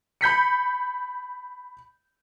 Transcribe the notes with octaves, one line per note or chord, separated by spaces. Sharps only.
B5 G6 B6 C#7